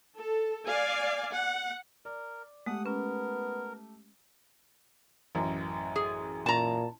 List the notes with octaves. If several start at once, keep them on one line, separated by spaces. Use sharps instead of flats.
A4
D5 F5 G#5
F#5
A#4 D5
G#3 A3 G4 F#5 D#6
B3 C#4 A#4
A1 F#2
G#4
A#2 A5 A#5